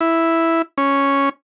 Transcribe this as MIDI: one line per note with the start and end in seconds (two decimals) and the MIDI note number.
0.01 0.62 64
0.78 1.29 61